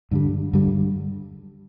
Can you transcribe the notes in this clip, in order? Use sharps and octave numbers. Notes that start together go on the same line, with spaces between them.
G2 D3 G3
G2 D3 G3